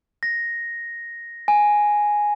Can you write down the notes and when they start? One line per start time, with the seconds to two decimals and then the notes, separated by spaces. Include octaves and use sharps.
0.23 A#6
1.48 G#5